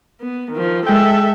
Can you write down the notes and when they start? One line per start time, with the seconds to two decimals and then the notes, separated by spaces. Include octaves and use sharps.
0.21 B3
0.51 D#3 F3
0.86 G#3 A4 E5 G5